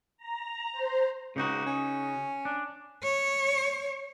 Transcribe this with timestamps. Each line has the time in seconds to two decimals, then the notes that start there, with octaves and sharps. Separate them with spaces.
0.17 A#5
0.72 C5
1.36 C#2 C#3 D#4 F#4
1.66 C#4
2.45 D4
3.03 C#5